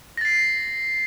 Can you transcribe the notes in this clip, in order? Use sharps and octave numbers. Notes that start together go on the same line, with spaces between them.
A6 A#6 C7